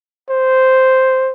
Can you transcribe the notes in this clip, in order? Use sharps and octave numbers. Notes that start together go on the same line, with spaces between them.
C5